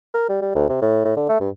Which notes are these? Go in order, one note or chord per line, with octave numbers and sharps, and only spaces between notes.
A#4
G3
G3
D2
C3
A2
A2
D3
A3
G2